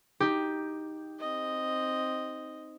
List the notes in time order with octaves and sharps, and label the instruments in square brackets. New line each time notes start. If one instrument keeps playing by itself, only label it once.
[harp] D#4 G4
[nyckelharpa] C4 D#5